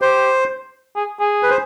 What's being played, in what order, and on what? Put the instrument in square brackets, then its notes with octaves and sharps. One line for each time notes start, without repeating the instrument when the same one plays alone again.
[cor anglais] G4 [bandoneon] C5
[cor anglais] G#4
G#4
[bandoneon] B4
C5